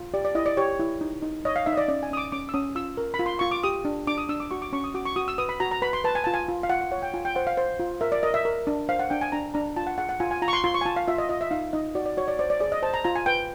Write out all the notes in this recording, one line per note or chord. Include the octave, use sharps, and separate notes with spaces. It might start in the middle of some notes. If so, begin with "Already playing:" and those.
Already playing: F4
G4 D5
D5
E4 D#5
D5
G4 C#5
E4
D#4
D#4
C#5 D#5
F5
D#4 E5
D#5
D5
C#4 D5
G#5
C#4 D#6
D6
C#4 D6
E6
C#4 D#6
F4 E6
A#4
B5
F4
C6
F4 C#6
D6
G4 D#6
D4
D4 D6
D#6
D4 E6
D6
F#4 C#6
D6
C#4 C#6
D#6
F#4 D6
C#6
F#4 D#6
E6
B4 D#6
B5
F#4 A#5
A#5
B4 B5
C6
B4 A5
G#5
F4 A5
G#5
F4
F5
F4 F#5
F#5
C#5 F#5
G5
F4 G#5
G5
C5 F#5
F5
C5
F4
A#4 E5
D5
A#4 D#5
E5
A#4
D4
C5 F5
F#5
D4 G5
G#5
D4 A#5
D4 A#5
F4 A5
F#5
G#4 F#5
F#5
F4 G#5
G#5
F4 A#5
C#6
C6
F4 C6
C#6
G#5
F4 A5
F5
F4 E5
D#5
F4 D#5
E5
D#4 F5
D#4 D#5
F#4 D5
D5
F#4 C#5
D5
C5 D5
D5
G#4 D5
D#5
C5 A5
A#5
F4 A#5
G#5
B4 G5